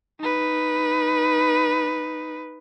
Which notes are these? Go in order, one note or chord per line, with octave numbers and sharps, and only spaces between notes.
D#4 B4